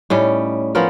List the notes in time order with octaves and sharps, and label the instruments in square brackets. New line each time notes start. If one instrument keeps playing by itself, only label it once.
[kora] A2 G3 C#4 D#4
F3 B3 C#4 A#4